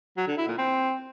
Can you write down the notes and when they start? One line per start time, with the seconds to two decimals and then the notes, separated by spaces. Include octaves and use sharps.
0.17 F#3
0.27 D3
0.38 E4
0.48 A#2
0.58 C4